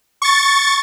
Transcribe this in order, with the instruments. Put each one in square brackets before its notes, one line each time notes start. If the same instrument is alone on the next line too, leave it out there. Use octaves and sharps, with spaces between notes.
[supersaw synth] C#6 A6